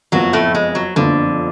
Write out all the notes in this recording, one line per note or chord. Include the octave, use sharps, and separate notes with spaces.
F#1 F2 F3 F#3 B3 F4 F#4
A2 A3
G#3
F#3
F#1 F2 D3 F3 B3 F4